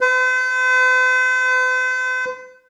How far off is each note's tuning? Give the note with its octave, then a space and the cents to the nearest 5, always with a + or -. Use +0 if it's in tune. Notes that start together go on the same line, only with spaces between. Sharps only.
C5 -45